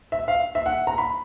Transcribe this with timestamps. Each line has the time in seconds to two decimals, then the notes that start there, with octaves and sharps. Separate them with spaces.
0.12 E5
0.28 F5
0.55 E5
0.66 F#5
0.87 A#5
0.98 B5